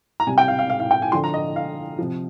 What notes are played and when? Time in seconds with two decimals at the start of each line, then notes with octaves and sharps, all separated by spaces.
0.20 A#5
0.27 C3 G3 G#5
0.38 G5
0.48 F5
0.59 F5
0.70 F5
0.80 F5
0.91 G5
1.02 G#5
1.12 D3 F3 C6
1.24 A#5
1.34 D#5
1.56 F5
1.99 C3 F3